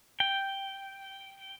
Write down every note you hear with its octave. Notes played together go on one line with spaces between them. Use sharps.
G5